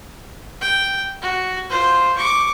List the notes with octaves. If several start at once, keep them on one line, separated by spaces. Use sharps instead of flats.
G5
F#4
F4 C5
C#6 D6